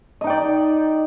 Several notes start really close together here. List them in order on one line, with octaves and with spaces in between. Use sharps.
D#5 D#4 G5 D5